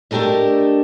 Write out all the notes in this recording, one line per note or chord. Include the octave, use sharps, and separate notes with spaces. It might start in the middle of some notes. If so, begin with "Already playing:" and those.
A3 D4 G4 A4 A#4 D#5